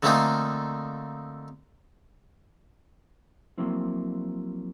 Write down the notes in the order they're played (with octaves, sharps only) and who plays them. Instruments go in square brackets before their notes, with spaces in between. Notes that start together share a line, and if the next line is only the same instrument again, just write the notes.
[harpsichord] D3 F3 A3 A#3 C4 D#4
[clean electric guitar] F3 F#3 A#3 C4 E4